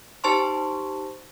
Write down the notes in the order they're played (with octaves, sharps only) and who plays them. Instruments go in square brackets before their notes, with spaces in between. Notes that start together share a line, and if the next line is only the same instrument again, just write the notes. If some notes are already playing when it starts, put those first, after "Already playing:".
[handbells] D#4 G4 C5 A5 C6 C#6